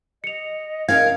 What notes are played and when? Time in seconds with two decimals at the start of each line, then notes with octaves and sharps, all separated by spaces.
0.24 D#5 C#7 F7
0.89 C#4 A#4 F5 G#6